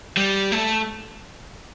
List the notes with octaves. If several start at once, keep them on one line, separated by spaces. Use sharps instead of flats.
G3
A3